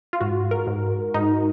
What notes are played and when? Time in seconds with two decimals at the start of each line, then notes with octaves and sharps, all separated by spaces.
0.13 F4
0.20 G#2 F#4
0.51 A#4
0.67 G#2
1.14 G#2 D#4